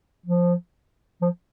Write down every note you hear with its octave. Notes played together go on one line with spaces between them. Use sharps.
F3
F3